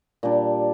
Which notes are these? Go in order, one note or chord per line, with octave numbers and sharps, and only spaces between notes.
A#2 G3 D4